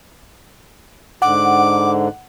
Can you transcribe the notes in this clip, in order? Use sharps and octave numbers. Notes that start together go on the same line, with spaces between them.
G#2 D3 F#5 D6